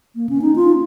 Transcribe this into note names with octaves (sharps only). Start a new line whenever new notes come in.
A#3
C#4
D#4
F4